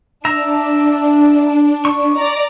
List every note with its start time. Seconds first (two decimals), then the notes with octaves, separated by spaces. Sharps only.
0.25 D4 E5 A#5
1.85 C#6
2.16 D5 A#5